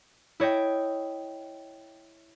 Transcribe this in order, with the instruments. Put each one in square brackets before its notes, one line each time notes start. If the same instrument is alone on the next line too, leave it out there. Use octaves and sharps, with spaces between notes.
[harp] E4 C#5 D#5 G5